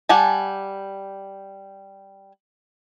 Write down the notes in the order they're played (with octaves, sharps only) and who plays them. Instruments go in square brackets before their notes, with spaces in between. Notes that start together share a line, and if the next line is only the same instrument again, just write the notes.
[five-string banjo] G3 F#5 G#5 A5